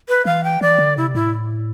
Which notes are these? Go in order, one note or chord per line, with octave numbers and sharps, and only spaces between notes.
B4
E3 F5
G5
E3 D5
D3
C3 E4
A2 E4